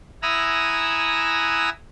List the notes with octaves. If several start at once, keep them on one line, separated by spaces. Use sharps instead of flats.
E4 F#5 G#5 A#5 D#6 E6